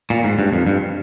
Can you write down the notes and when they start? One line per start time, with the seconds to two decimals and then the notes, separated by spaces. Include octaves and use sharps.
0.10 A#2
0.24 G#2
0.39 G2
0.52 F2
0.67 G2